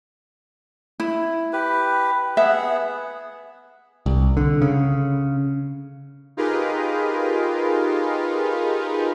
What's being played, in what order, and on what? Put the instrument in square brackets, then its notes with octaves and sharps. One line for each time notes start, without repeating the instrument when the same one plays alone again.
[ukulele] E4
[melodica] G4 B4
[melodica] B3 G#4 F#5 [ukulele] E5
[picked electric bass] C2
D3
C#3
[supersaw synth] D#4 F4 G4 G#4 A#4 B4